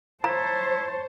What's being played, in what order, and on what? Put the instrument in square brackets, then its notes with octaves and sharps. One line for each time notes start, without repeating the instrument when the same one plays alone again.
[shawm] E4 [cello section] C5 [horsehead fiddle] C#5 A5 [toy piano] A#5